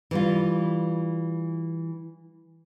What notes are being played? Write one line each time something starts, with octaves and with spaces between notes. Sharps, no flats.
E3 G3 F4